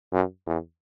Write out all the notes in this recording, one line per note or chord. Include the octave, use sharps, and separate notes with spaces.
F#2
E2